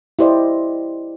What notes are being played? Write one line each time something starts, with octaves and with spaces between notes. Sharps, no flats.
E4 G4 C5 D5 D#5